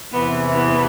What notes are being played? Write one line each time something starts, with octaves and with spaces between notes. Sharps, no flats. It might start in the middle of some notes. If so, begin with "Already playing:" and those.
E2 C3 E3 B3
B3